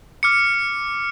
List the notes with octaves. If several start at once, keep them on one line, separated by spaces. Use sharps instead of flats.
D6 F6 C#7